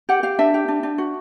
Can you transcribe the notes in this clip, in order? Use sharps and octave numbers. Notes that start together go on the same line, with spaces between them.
G4 F#5
G4 F5
D4 E5
G4
D4
D4
F#4